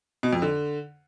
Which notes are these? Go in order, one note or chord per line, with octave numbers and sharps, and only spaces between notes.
B2
F2
D3